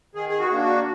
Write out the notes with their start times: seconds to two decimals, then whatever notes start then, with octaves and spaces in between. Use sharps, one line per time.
0.15 D#3 G#4
0.29 G#4
0.40 F#4
0.51 A#3 D4
0.64 F#4